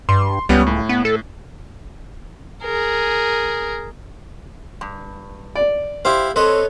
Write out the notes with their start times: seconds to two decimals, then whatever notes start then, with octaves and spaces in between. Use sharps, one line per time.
0.09 G2 C6
0.49 C#2 G3 B3 C#4
0.67 A2
0.89 B3
1.05 A4
2.63 G#4 A#4
4.81 G2
5.55 D5
6.05 E4 G4 C5 F5
6.36 C4 A4 B4 C#5 D#5